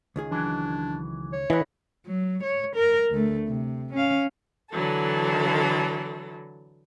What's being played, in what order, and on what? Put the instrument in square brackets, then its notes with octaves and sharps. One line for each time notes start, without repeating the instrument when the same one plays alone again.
[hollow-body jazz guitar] C#2 D#3 G#4
[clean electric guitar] E3 F#3 [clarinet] D4
[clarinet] C#5
[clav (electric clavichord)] E3 [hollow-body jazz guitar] E4 F#5 [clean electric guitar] D#5 B5
[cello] F#3
C#5
A#4
D2 A3
C3
C#4 F5
[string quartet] D3 E3 F#3 A4